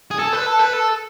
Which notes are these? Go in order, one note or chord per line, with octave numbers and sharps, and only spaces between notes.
G#4
A4
B4
A4
B4
A4